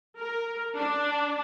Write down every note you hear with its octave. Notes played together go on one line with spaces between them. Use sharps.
A#4
D4